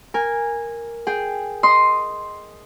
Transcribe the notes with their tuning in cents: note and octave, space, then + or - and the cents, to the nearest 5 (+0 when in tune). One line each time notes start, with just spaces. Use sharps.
A#4 +0 G#5 -15
G#4 +0 G5 +0
D#5 +0 C6 +0 D#6 +0